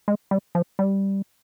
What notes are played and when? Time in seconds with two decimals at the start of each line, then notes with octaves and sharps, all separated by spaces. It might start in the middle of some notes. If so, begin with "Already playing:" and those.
0.08 G#3
0.31 G3
0.55 F3
0.79 G3